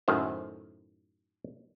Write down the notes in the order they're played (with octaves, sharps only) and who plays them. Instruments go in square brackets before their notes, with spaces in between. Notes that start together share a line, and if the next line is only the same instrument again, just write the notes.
[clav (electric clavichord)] F#2 A2 D#3 C5